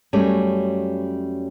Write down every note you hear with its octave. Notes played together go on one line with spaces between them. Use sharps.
F#2 G3 A3 C#4